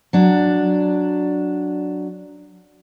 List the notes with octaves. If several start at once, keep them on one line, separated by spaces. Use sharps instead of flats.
F#3 D4